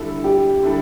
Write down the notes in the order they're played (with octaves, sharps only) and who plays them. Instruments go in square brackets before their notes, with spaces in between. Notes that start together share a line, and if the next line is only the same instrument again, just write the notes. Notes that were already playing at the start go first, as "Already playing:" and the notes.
Already playing: [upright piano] D3 G3 E4 A4
[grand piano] G4
[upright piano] D3 G3 E4 A4